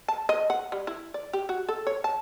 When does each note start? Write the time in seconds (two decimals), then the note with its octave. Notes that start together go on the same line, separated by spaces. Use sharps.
0.08 A5
0.29 D#5
0.50 F#5
0.72 G3
0.87 E4
1.14 D5
1.33 G4
1.49 F#4
1.69 A4
1.87 C#5
2.04 A5